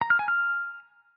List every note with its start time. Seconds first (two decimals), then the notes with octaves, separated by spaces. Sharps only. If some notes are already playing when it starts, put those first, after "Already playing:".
0.01 A#5
0.10 F6
0.19 G#5
0.28 F6